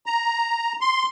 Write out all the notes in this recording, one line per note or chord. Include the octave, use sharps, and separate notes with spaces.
A#5
C6